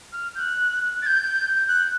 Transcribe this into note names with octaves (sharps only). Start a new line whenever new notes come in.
F6
G6
F#6
A6
G6
F#6